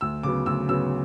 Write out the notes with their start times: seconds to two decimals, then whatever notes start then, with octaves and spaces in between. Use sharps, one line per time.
0.01 D2 E6
0.23 C#3 F#3 B3 D6
0.46 D2 E6
0.68 C#3 F#3 B3 E6